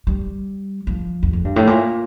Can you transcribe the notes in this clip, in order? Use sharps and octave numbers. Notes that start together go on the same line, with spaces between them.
G3
F3
E2
F2
G2
A2
A#2